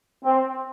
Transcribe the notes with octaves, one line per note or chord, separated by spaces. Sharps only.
C4